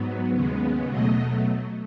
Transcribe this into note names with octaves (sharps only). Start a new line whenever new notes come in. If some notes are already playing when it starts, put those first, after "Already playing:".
Already playing: G#2 F#3 B3
D#2 C#3 G#3 B3
B2 F#3 A3 D#5